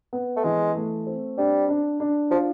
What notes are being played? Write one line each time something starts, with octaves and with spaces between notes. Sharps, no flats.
B3
A3
E3 G#3
A3
C4
G3 D4
D4
D4
F3 F4